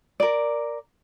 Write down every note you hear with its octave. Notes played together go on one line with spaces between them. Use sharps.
A#4 D5